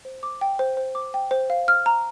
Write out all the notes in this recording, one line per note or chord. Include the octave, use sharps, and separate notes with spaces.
C5
D6
G5
C5
C5
D6
G5
C5
F5
F6
A#5